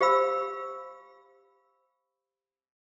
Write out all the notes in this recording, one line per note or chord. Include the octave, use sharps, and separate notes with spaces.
G4 C5 F5 B5 E6